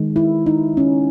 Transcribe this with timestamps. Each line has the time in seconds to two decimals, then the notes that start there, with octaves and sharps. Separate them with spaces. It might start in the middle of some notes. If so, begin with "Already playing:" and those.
Already playing: D#3 G#3
0.16 E4
0.46 D#4
0.77 C#4